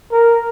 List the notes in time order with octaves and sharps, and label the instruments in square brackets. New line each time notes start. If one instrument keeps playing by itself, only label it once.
[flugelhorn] A#4